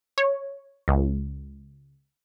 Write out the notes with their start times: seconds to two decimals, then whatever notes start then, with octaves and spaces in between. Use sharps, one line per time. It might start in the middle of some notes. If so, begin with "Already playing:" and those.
0.18 C#5
0.88 C#2